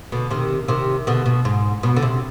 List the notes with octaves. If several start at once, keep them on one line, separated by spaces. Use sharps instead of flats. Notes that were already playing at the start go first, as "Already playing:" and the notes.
B2 D3
C3 D#3
C3 D#3
B2 D3
B2
G#2
B2
D3
C3